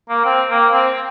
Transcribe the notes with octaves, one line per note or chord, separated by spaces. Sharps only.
A#3
C4
A#3
C4